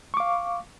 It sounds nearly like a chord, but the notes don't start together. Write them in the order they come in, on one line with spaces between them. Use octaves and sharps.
C#6 D6 F5